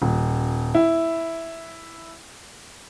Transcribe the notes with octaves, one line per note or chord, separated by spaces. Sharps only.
D#1
E4